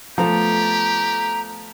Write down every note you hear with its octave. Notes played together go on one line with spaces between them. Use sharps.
F3 A3 B3 G4 A4 A#5